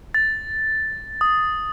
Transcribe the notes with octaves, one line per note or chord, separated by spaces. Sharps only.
A6
D#6